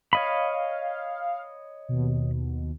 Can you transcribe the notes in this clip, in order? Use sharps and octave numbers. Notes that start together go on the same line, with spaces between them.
C#5 D#5 F5 B5
D#2 B2